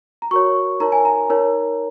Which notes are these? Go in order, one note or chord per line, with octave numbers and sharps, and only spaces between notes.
A#5
F#4 A#4 C#5 C#6
D#4 A#4 C#5 A#5
G#5
A#5
D#4 A#4 C#5